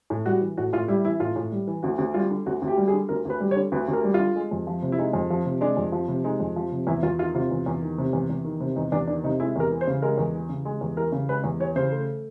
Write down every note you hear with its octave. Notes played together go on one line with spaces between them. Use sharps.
A2
G3 F#4
E3
A2 F#4
A2 F4
G3 E4
E3 E4
A2 F4
A2
G3
E3
D2 F#4
D2
G3 F4
D3
D2 F#4
D2
G4
G3
G#4
D3
D2 A#4
D2 B4
G3
C#5
D3
D2 B4
D2
A#4
G3
F4
D3
G#3
F2
F3
C3
E4
G#3 D#4
F2
F3
C3
G#3 D4
F2
F3
C3
G#3 D#4
F2
F3
C3
E2 E4
E2 F4
D#3 F4
C3 F4
E2
E2
D#3
C3
E2
E2
D#3
C3
E2 D#4
E2 D4
D#3 D4
C3 D#4
G#3 E4
E2 A#4
E3
C5
C#3
G#3 A#4
E2
E3
C#3
G#3
E2
E3 A#4
C#3
G#3 B4
E2
E3 C#5
C#3 C5
A3